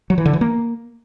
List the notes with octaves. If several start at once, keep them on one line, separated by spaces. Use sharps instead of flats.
F#3
E3
D3
E3
A#3